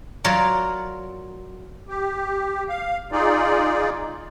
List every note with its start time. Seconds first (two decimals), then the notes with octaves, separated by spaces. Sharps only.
0.24 F#3 F4 A#4 C#5 D5
1.88 G4
2.69 F5
3.12 D#4 F4 G#4 D5